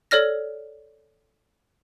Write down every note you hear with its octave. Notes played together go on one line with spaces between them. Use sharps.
A4 C#5 D5 F6 A#6